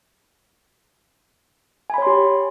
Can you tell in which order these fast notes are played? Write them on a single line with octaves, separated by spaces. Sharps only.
G#5 B5 C#5 C6 G4